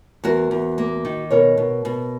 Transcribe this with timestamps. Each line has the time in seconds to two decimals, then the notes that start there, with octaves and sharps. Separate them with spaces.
0.24 E2 F#4 A#4
0.51 E2
0.78 A#3
1.05 D#3
1.31 B2 A#4 C#5
1.57 B2
1.85 B2